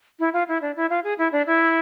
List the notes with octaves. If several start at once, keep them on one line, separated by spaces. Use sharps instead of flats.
E4
F4
E4
D4
E4
F4
G#4
E4
D4
E4